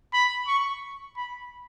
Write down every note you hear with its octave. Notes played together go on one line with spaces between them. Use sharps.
B5
C#6
B5